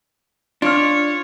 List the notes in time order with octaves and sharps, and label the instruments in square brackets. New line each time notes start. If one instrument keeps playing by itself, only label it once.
[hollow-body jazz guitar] D4 [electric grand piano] F4 F6 [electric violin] C#5